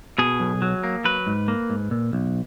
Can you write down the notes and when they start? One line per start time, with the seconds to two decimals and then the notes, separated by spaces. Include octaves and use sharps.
0.18 B2 G#4
0.40 B1
0.62 F#3
0.83 A#3
1.05 F#3 B4
1.27 G#2
1.48 A#3
1.70 G#2
1.91 A#2
2.13 B1